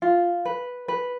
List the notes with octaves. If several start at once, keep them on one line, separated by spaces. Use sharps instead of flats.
F4
B4
B4